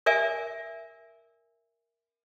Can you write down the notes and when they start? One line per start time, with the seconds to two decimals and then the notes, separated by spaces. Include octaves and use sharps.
0.06 A#4 D5 E5 G#5